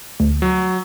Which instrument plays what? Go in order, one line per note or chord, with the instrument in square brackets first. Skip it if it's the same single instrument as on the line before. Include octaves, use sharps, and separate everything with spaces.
[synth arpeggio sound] D2
[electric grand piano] F#3